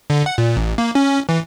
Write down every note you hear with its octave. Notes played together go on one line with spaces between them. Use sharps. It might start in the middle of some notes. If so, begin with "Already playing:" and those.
D3
F#5
A#2
A1
A#3
C#4
E3